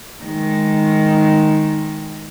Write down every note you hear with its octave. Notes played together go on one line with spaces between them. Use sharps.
D#3 G#3